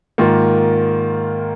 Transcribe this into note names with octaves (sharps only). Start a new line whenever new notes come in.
G#2 D#3 A#3 F4